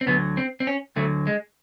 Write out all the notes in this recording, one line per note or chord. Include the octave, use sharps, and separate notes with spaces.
C4
D2 D3 F#3 B3
C4
C4
C#4
D2 D3 F#3 A3
G#3